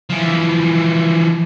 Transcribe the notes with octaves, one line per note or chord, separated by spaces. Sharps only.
E3 F3